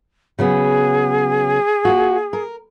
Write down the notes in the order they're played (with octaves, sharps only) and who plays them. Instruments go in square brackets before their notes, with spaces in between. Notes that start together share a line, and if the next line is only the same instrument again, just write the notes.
[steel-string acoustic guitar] C#3 F#3 B3 [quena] G#4
[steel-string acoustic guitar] A#3 F4 F#4
A#4